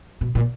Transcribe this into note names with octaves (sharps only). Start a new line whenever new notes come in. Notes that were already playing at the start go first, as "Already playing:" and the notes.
B2
A#2